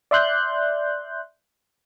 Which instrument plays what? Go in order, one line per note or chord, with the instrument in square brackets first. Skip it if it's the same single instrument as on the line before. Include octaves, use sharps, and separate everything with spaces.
[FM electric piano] D5 E5 C6 F#6 G6